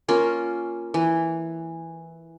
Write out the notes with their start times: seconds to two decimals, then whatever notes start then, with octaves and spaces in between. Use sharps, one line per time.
0.08 A#3 C#4 F4
0.94 E3